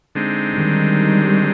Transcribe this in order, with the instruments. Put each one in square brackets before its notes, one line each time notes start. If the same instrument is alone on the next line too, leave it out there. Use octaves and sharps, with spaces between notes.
[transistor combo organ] D3 G#3 C4 D#4
[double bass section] D#3 G3